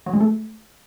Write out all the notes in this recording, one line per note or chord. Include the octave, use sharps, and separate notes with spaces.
F#3
G#3
A3